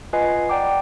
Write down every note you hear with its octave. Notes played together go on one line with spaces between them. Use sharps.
F4 B4 D#5 F#5 G#5 C7
D5 F#5 G5 A#5 D6